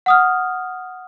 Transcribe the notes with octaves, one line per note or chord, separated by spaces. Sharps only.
F#5 D#6 F6